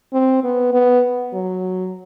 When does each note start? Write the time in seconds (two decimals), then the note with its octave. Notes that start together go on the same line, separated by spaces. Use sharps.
0.13 C4
0.44 B3
0.74 B3
1.34 F#3